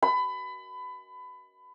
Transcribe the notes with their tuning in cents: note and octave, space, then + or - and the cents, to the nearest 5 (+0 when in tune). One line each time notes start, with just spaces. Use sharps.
B5 +25